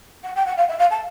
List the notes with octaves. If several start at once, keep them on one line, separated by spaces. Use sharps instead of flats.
F#5
G5
F#5
F5
E5
F5
A5